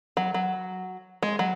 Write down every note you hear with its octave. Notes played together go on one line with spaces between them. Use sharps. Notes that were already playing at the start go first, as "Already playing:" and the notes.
F#3
F#3
G#3
F#3